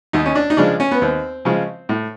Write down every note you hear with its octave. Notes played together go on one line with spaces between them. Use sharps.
D#2 D#4
C#4
D4
D#4
C#3 F3 G#3 D4
C#4
B3
D#2 C4
C#3 F3 G#3
A2